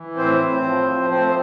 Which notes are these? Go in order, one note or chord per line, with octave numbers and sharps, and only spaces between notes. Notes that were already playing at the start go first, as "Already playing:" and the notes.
Already playing: E3
A2 C4 C5
A2
F3
F3
A2 C4 C5